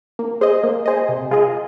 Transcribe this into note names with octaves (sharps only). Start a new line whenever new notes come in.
A#3
G#4 C5 D#5
A#3
G#4 C5 D#5
C3
G#3 F4 G#4 D#5